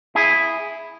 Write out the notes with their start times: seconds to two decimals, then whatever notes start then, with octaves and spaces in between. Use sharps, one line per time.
0.15 E4 G#4